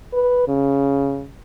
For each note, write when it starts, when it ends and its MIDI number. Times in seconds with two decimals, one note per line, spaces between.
0.13 0.44 71
0.48 1.26 49